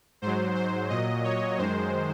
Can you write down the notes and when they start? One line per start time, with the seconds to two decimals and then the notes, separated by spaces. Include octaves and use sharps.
0.22 G#2 F#3 C5
0.55 C5
0.89 A#2 F#3 D#5
1.24 C#5
1.58 F#2 D#3 G#3 C5